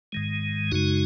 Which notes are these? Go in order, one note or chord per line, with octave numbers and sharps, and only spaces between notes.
G#2 D#3 G#3
F#2 C#3 G#3 D#4 F#4